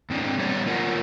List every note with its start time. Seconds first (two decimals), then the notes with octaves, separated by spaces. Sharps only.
0.10 G#2 C4 D4 D5
0.38 G3 B3 C#5 D5
0.66 A#3 F4 A#4 C#5 F#5